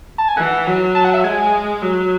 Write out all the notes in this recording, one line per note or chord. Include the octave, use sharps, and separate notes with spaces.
A5
G#5
E3 F#5
F#3
A5
F#5
E5
G#3 G#5
F#3